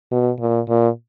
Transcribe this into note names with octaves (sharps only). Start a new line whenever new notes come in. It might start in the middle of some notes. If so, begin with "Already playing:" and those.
B2
A#2
A#2